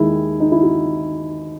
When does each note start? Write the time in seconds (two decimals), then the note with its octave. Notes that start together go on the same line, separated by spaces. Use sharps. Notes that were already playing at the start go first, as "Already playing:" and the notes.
Already playing: D#2 D#3 G#3 E4
0.40 D#4
0.52 E4
0.63 F#4